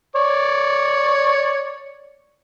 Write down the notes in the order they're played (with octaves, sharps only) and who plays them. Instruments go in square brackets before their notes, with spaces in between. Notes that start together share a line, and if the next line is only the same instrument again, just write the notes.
[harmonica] C#5 D5